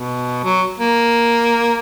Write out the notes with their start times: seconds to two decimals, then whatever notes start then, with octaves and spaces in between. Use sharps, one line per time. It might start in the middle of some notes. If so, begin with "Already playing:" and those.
Already playing: B2
0.44 F#3
0.78 A#3